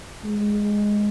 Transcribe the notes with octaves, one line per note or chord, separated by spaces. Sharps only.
G#3